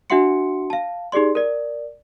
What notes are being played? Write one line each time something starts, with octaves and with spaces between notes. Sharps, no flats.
D4 F#4 E5 F#5 C6 C#7
F5 A5
D#4 G4 G#4 D5 C6
A#4 D5